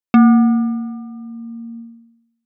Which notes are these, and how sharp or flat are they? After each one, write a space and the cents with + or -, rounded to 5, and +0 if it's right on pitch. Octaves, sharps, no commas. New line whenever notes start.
A#3 -15